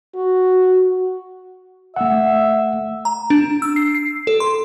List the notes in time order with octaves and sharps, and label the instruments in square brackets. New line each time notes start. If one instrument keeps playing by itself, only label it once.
[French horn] F#4
[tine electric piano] A3 F#5 [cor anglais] E5
[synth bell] A#5
D4
E6
C7
C7
A4
C6